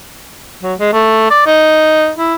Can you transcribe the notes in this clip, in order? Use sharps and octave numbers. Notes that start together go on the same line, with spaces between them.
F#3
G#3
A3
D5
D#4
E4